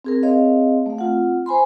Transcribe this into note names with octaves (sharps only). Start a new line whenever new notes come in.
C4 G#4 A#4
C4 G#4 C#5 D#5 F5
A3 F5
C4 F4 F#5
C5 G#5 B5 C6